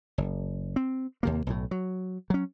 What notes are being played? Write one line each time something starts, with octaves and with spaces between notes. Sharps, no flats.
F#1
C4
D#2 C3 A#3
B1 A2
F#3
F#3 C#4